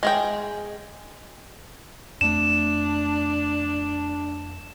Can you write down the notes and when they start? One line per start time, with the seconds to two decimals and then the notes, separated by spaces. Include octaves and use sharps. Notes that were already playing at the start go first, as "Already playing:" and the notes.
0.03 G#3 G#4 G5
2.21 F2 A3 D4 E7